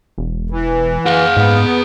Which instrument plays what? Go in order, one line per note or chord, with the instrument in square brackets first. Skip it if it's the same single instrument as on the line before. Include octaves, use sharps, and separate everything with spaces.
[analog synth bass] E1
[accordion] E3
[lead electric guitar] G#4 F#5 [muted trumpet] F5
[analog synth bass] G#2 [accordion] B3